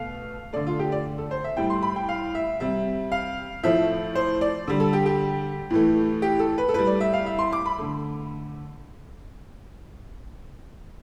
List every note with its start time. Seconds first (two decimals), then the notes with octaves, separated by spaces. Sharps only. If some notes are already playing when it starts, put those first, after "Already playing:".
Already playing: B2 A3 F5
0.53 D3 A3 D5
0.67 F4
0.79 G4
0.92 D5
1.18 A4
1.31 C5
1.44 E5
1.57 A2 G3 G5
1.70 C6
1.83 B5
1.96 G5
2.09 F5
2.35 E5
2.60 C3 G3 E5
3.12 F5
3.63 A2 F3 A3 E5
4.15 C5
4.41 D5
4.67 D3 G3
4.80 A4
4.93 G4
5.06 G4
5.70 A2 E3 A3
6.22 G4
6.40 A4
6.58 B4
6.69 A4
6.74 A2 G3 B4
6.87 D5
7.01 E5
7.13 F5
7.26 E5
7.39 C6
7.53 D6
7.66 B5
7.78 D3 A3